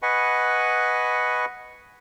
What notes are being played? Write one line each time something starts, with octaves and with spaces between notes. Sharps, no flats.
B4 D#5 F#5 G#5 B5 C#6